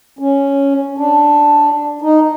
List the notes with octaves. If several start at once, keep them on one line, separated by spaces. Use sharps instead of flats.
C#4
D4
D#4